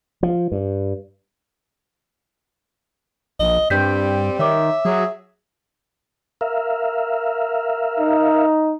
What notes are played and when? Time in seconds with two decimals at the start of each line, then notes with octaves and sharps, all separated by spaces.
0.23 F3
0.52 G2
3.40 A#1 D#5
3.70 G2 G3 C4 G6 B6
4.39 D#3 C#5 E5 D6
4.85 F#3 G#4
6.41 A#4 E5 F5
7.99 D#4